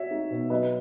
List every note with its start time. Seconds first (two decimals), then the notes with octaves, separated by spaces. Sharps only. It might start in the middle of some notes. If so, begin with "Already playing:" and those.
Already playing: F#4 C#5 E5
0.11 D#4
0.30 B2
0.50 F#3 B4 D#5